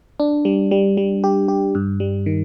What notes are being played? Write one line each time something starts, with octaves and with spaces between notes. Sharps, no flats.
D4
G3
G3
G3
G4
G4
G2
G3
D#3